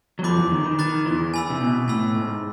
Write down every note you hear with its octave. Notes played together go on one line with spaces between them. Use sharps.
F#3
F2 F3 B5 D6 F#6 A6
E2 E3
D#3
D#3
D#3 B5 D6 F#6 A6
E2 E3
G#5 B5 E6
C3
B2
A2 G#5 B5 E6
G#2